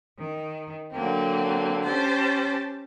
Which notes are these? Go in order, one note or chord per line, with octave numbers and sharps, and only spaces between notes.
D#3
D3 F#3 A#3 C4
C#4 G4 C5 A5